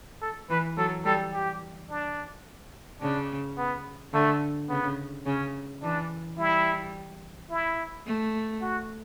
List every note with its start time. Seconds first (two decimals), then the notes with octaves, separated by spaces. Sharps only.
0.21 A4
0.50 E3 B4
0.77 F#3 A4
1.05 G3 A4
1.34 G4
1.90 D4
3.02 C#3 D4
3.58 B3
4.13 D3 A3
4.70 C#3 B3
5.26 C#3 C#4
5.82 E3 D4
6.38 G3 E4
7.50 E4
8.06 A3
8.62 F#4